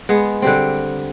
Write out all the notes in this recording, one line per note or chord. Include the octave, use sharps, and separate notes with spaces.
G#3 B3
D3 G3 C4